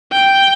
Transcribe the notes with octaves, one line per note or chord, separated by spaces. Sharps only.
G5